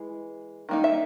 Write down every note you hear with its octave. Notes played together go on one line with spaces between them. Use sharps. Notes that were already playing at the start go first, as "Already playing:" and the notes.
Already playing: E3 G#3
D#3 A#3 D#4
E5